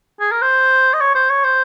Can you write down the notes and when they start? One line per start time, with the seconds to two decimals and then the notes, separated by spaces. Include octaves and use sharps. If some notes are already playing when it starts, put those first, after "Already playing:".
0.20 G#4
0.31 A#4
0.42 C5
0.94 D#5
1.01 C#5
1.15 C5
1.30 C#5
1.44 C5